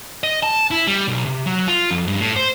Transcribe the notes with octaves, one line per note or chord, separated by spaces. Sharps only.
D#5
A5
E4
G3
B1
C3
F#3
F4
F2
G2
A2
C5